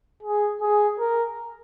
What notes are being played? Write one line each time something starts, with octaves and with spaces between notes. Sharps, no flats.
G#4
G#4
A#4